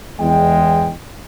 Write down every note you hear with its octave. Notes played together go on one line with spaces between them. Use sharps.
E2 G#3 G5